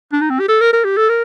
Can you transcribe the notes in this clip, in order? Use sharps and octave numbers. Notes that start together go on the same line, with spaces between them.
D4
D#4
C4
G4
A4
A#4
A#4
G4
A4
A#4